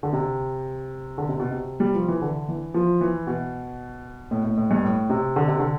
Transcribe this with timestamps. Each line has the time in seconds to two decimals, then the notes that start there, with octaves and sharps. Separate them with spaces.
0.03 D3
0.13 C3
1.18 D3
1.29 C3
1.40 B2
1.51 C3
1.80 G3
1.94 F3
2.08 E3
2.22 D3
2.48 E3
2.74 F3
3.01 E3
3.27 B2
4.31 A2
4.44 A2
4.57 A2
4.71 G2
4.84 A2
5.10 C3
5.36 D3
5.48 C3
5.59 D3